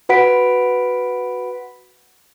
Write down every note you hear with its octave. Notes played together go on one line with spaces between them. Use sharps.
F#4 B4 F#5 B5 B6 D7